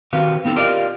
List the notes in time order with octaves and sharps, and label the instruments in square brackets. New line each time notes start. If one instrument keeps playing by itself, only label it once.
[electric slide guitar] D#3 C4 F#4 G4 B4 F5
B3 C4 D#4 A4
F4 G4 A#4 D5 D#5 F5